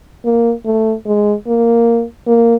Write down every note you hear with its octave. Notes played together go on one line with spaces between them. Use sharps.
A#3
A3
G#3
A#3
A#3